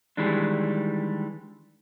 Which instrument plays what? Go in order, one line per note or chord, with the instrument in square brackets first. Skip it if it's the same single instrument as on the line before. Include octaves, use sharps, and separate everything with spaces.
[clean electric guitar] D#3 E3 G3 G#3 D4